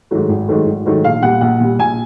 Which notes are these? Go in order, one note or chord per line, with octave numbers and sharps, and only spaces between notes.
G#2 D#3 F#3 A3
G#1
G#2 D#3 F#3 A3
G#1
G#2 D#3 F#3 A3
A#1 F5
A#2 G3 F#5
A#1 F#5
A#2 G3
A#1 G#5